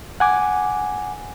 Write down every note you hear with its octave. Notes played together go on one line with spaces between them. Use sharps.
F#5 G#5 D6